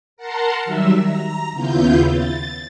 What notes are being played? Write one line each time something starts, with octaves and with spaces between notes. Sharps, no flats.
A#4 F#5 A5 A#5 C6
D#3 F#3 G3 E5 E6
A#5
D#2 C#3 B3 E4 F4 G6
A6